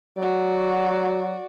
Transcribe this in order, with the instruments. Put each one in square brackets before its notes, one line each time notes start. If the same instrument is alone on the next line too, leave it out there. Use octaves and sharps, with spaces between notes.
[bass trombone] F#3 [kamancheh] F#4 D5